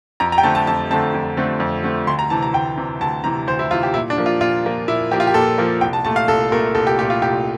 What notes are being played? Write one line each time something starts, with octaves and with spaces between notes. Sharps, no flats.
F2 A#5
A#5
G5
D3 A3 C4 A5
A5
F2 A5
D3 A3 C4 A5
F2
D3 A3 C4
F2
D3 A3 C4
D2 C6
A#5
C3 E3 A5
A#5
D2 G5
C3 E3
D2 A5
C3 E3 A#5
D2 C5
E4
C3 E3 F4
G4
A#2 E4
D4
F3 A#3
F4
A#2 F4
F3 A#3
A#2 E4
F3 A#3 G4
F4
G4
A#2 A4
F3 A#3
C2 G5
A5
A#2 A3 A5
F5
C2 A4
A#2 A3 A#4
C2 A4
G4
A#2 A3 G4
F4
C2 G4